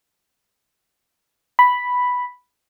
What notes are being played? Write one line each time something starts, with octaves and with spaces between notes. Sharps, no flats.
B5